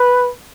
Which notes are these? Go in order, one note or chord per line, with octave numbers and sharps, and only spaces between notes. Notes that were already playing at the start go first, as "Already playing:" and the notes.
Already playing: B4